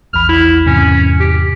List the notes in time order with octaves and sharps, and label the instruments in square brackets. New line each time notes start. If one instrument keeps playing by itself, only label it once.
[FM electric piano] A#1 E2 B5 [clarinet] F6
[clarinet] E4
[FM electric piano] E2 G#2 C3 [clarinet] C#4
[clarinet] G4